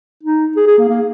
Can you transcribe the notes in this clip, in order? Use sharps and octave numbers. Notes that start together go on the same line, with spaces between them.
D#4
G#4
G#4
A#3
A#3